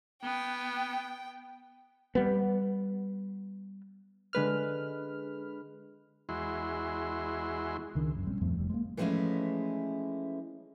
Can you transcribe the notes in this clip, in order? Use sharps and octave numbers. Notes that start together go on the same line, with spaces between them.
B3 G5
G3 B3
D3 G#3 B4 F6
E2 G#3 E4 F#4 C6
C#2 D#3 D4
G1 F#2
A#1 G3 C4 C#4
F2 A2 F3 A3
F1 D2 G3
G#3 A#3
E3 F3 G#3 A3 C#4 E4